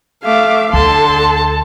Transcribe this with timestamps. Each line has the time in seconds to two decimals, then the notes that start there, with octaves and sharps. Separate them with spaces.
0.24 A3 E5 F5 D6
0.73 D2 D3 A4 A5 C6